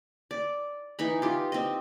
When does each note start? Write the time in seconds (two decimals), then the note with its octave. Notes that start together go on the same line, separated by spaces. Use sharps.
0.31 D5
0.99 E3 D#4 B5
1.22 F4 G4
1.52 C4 D#5